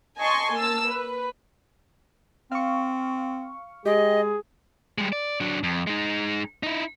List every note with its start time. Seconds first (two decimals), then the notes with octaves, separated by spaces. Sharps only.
0.19 D#5 G#5 A5 C6 C#6
0.54 A#3 A5 E6
0.88 B4
2.52 C4 F5 C#6
3.86 G#3 G4 G#4 D#5
4.98 G3 G#3
5.13 D5
5.40 F#3 D4
5.63 F2
5.87 G#3 D#4
6.63 D#4 E4